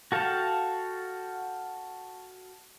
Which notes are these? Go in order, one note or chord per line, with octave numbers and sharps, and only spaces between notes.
F#4 A4 F5 G5 A5